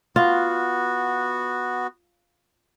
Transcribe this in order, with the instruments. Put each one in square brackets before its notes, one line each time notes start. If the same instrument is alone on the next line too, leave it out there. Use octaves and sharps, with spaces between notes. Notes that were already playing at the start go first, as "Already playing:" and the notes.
[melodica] B3 F#4 [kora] F4